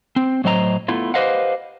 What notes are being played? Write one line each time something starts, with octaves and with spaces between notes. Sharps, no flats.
C4
A2 F#3 C5 D#5 F#5 A#5
A3 B3 E4 F4
G4 B4 C5 D#5 F5 F#5